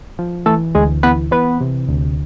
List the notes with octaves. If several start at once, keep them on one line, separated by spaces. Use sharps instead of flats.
F3
E3 A3 A4
D2 G#3 G#4
E3 B3 B4
E3 B3 B4
C3
D2